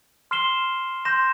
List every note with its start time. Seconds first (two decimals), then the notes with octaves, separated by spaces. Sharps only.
0.31 C6 F6 C7 E7 G7
1.05 C6 G6 A#6 E7